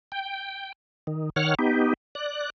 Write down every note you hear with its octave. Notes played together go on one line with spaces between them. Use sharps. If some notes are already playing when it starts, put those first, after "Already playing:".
G5
D#3
D#3 C#5 F#5 F6
B3 D#4 G4
D5 F#6